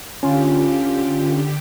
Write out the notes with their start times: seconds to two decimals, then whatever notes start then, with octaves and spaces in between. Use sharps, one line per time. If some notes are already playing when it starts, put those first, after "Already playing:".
0.23 D3 C#4 F4 G4